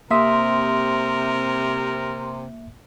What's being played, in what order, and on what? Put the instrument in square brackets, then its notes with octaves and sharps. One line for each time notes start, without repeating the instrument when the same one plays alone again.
[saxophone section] C3 [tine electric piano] A#3 E5 D#6 [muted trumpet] A#4 [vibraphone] C6